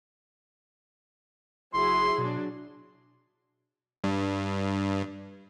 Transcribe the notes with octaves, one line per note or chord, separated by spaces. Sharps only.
F#1 F#3 E4 G#4 C6
B2 F#3 D4
G2